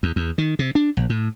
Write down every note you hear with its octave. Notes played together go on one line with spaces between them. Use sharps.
E2
E2
D#3
C3
D4
A#1
A2